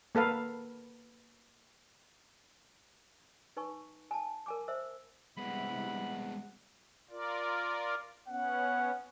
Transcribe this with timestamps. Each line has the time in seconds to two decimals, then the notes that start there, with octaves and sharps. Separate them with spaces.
0.15 A#3 A4 B4 F5
3.57 D#4 B4 G#5 C#6
4.11 G#5 A5
4.46 A#4 G#5 D6
4.68 C5 E5 E6
5.37 C3 G3 G#3 B3 E4 F#5 B5
7.10 F4 A#4 D5
8.28 B3 C#4 F#5